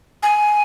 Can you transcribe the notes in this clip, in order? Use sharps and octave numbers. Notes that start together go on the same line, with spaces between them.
G#5